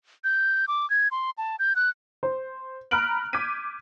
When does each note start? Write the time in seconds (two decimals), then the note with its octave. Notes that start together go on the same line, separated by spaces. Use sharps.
0.24 G6
0.68 D6
0.90 G#6
1.11 C6
1.38 A5
1.59 G6
1.76 F#6
2.23 C5
2.91 A#5 B5 F6 F#6 D7 F#7
3.33 D6 G6 G#6 B6 D#7